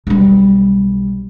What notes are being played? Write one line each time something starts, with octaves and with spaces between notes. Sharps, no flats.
B1 G3